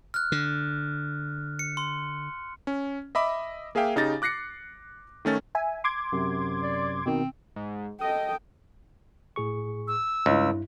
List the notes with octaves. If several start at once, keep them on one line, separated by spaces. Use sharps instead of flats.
F6 F#6
D3
C#7
C6
C#4
D#5 E5 B5 D6
A#3 G#4 E5 F5 G5
C#3 D#4 G4 A6 A#6
D6 F#6 A#6 C7 C#7
D#3 A3 C#4 A6
E5 G#5
C6 D6 G#6
F#2 C3
D5
B2 D#3 C4
G#2
A4 D#5 G5
A2 G#4 C#6
E6
C#2 G2 E4